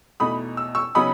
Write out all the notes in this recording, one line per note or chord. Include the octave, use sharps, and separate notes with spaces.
E2 B2 A3 D#4 B5 D#6
E6
C#6 E6
C#3 F#3 B3 D#4 B5 D#6